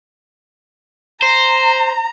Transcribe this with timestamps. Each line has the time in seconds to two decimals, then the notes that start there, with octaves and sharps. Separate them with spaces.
1.22 C5 A#5